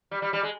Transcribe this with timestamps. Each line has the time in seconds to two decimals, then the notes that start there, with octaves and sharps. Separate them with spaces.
0.11 G3
0.22 G3
0.33 G3
0.43 G#3